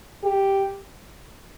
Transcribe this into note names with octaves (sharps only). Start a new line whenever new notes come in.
G4